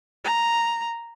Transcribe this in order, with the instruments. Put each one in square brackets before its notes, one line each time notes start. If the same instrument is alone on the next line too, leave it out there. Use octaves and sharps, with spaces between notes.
[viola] A#5